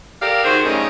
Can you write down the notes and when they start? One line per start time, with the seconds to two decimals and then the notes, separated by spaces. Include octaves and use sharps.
0.21 G4 A4 A#4 D5 F5
0.44 D#3 F#4 G#4 C5
0.64 C#3 F#3 G3 A3 D#4